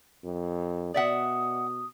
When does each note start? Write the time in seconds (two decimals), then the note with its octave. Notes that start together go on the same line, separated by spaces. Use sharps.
0.24 F2
0.94 B2 D5 E5 F#5 D#6